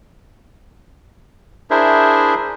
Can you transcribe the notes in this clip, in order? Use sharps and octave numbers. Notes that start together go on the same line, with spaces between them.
D4 E4 G#4 A#4 C5 E5